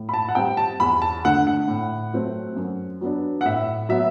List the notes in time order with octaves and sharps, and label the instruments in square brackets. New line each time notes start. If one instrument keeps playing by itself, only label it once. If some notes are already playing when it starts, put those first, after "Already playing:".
Already playing: [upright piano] A2
B5
A5
F#5
G3 C4 G5
A5
E2 B5
A5
D3 A3 F#5
F#5
A2
F#3 A3 C4
F#2
F#3 B3 D4
F#5
A2 E5
F#3 B3 E5